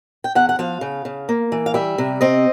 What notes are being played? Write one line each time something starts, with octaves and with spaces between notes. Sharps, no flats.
G5
E2 F#5
F#5
F3 F5
C#3
C#3
A#3
E3
F5
G3 E5
C3
C4 D#5